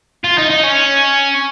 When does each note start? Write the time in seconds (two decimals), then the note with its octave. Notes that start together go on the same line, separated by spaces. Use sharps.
0.24 F4
0.38 D#4
0.50 D#4
0.63 C#4